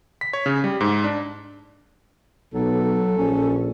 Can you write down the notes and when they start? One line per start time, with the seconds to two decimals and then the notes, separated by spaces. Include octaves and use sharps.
0.21 B6
0.33 C#5
0.46 C#3
0.64 G3
0.81 G#2
1.04 D4
2.54 B1 F#3 A4
3.17 A#1 C#4